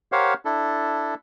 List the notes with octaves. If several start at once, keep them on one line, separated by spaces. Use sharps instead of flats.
G4 A#4 C5 C#5 F5 F#5
D4 E4 A4